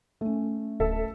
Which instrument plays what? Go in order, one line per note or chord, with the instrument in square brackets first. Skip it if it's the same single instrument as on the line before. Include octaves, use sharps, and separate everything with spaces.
[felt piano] A3 C#4
[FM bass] D1 [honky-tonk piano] A4 E5